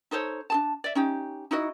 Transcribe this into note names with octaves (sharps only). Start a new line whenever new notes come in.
D#4 A4 C5 C#5
D4 G#4 A5
D5 E5
C#4 D#4 G4
D#4 E4 F#4 D#5